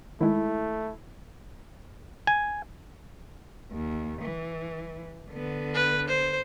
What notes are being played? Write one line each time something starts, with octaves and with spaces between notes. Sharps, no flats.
D#3 G#3 A3 E4
G#5
D#2
E3
D3 B3
B4
C5